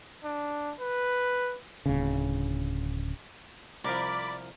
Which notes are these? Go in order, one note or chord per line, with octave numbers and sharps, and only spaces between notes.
D4
B4
D1 C#3
C2 F3 A#4 D5 B5 D6